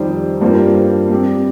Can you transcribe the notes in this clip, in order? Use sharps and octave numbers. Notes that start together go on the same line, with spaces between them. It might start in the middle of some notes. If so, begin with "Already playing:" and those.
Already playing: F2 D#3 G3 D#4 C5
G2 G3 A#3 F4 C5
G3 C4 G4